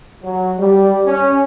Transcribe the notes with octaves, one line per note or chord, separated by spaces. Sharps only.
F#3
G3
C#4